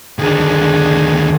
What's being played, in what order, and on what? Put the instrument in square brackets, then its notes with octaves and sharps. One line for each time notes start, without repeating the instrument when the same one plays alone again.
[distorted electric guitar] D2 D#3 [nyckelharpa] D4 G#4